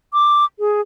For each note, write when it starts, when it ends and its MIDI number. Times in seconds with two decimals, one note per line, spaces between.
0.13 0.45 86
0.59 0.81 68